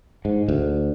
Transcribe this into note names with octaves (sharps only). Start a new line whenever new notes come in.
G#2
D2